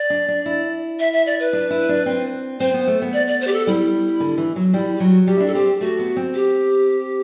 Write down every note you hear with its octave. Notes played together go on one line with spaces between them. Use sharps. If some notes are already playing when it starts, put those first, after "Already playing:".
Already playing: D5
D4
D4
E4
E5
E5
D5
B4
D4
E4
D4
C4
C4 C5
B3
A3
B3
D5
D5
C5
G4
A4
G3 E4
D3
E3
F#3
G3 E4
G4
F#3 F#4
G3 G4
E4
D4
A4
C4 G4
A3 F#4
B3
C4
G4